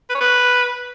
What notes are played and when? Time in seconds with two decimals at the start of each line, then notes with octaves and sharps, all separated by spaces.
0.09 B4
0.15 C#5
0.20 B4